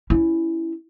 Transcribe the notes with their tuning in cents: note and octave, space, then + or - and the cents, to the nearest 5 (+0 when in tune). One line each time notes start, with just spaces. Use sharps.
C#4 +0 E4 +0